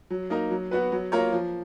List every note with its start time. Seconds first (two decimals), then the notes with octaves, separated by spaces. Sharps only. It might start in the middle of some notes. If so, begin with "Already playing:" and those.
0.10 F#3
0.30 A#3 D#4 A#4
0.51 F#3
0.71 B3 F#4 B4
0.92 F#3
1.12 A#3 F4 A#4 C#5
1.32 F3